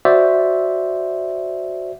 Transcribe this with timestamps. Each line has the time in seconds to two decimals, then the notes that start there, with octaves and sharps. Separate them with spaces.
0.05 F#4 C5 D5 E5